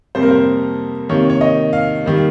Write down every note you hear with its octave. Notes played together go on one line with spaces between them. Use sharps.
F2 C3 G3 A#3 C5
A#4
C5
C3 D#3 A#3 C#5
C#5
D#5
F5
D#3 G3 A#3